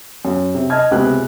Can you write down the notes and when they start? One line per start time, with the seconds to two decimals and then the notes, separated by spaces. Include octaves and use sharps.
0.25 F#2
0.55 C3
0.70 D#5 A5 F6 G#6
0.91 C#2 C3 B3 G4 G#4 F#6